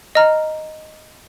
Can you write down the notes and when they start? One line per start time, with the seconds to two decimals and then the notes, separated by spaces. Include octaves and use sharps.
0.15 D#5 A#5 F6